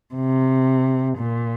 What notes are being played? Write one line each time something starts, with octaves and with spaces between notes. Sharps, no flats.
C3
A#2